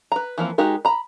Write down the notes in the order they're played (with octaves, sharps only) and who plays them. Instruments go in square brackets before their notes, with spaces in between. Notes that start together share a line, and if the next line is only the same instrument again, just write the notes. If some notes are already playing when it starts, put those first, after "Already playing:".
[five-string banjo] B4 A#5
E3 F3 A#3 C4
G#3 D#4 F#4 G4 A#4
A#5 B5